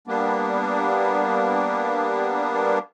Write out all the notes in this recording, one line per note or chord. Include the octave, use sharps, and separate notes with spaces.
G3 A#3 B3 D4